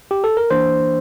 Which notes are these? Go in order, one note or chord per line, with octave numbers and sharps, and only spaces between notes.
G4
A4
A#4
E3 A#3 D4 C5